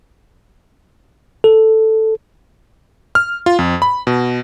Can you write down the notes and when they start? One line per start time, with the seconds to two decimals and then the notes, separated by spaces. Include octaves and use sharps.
1.44 A4
3.15 F6
3.46 F4
3.59 F2
3.82 B5
4.07 B2